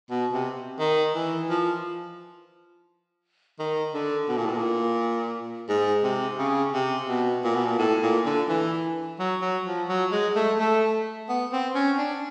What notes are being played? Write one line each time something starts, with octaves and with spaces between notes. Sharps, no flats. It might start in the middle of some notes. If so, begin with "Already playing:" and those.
B2
C3
D#3
E3
F3
D#3
D3
B2
A#2
A2
A#2
G#2
C3
C#3
C3
B2
A#2
B2
A#2
A2
A#2
D3
E3
F#3
F#3
F3
F#3
G#3
A3
A3
B3
C4
C#4
D4